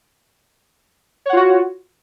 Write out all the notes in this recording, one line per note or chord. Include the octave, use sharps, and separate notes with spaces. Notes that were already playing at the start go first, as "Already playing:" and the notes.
F4 F#4 C#5 F#5